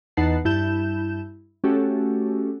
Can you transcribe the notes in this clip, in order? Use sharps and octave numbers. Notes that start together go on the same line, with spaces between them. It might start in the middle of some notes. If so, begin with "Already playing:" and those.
E2 D#4 B4 F#5 A5 C7
G2 E4 A5 G6 E7
A3 C#4 F#4 G4 A4